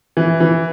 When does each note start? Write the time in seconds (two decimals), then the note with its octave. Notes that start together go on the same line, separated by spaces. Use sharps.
0.17 E3
0.40 E3